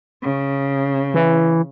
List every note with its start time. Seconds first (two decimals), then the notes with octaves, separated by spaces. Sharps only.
0.22 C#3
1.14 E3